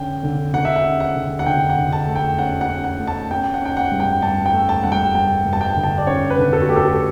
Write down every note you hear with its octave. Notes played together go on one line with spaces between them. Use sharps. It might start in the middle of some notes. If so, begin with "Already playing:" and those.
Already playing: D3 C#4 G5
D3
D3 F#5
E5
F#5
C#4
F#5
D3
F#5
D3 G5
F#5
D3
A5
A3
G5
C#4 F#5
F#5
C#4
F#5
A3
A5
C#4 G5
F#5
C#4 G5
F#5
G2
G5
G2 A5
G5
A3
A5
G2 F#5
G5
G2 G5
G2
A5
G5
D3
A5
D5
C#4 C#5
B4
D3
A4
F#4
A3 G4
A4